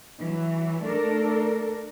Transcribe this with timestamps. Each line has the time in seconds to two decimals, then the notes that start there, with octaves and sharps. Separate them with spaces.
0.19 E3 F#3
0.83 A3 D4 A4 A#4